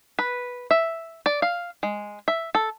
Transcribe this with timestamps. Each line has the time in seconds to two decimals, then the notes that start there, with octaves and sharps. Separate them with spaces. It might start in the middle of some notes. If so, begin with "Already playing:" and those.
0.19 B4
0.71 E5
1.26 D5
1.42 F5
1.83 G#3
2.28 E5
2.55 A4